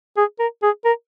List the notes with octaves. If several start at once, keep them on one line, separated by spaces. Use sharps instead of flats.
G#4
A#4
G#4
A#4